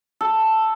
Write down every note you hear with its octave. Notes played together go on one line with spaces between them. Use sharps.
A4